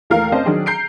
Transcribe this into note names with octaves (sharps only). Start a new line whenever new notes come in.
D#2 E3 A3 A#4 F5 F6
C4 C#4 C5 D5 D#5 A5
D#3 F#3 D4 G#4
A#5 G6 C7 D7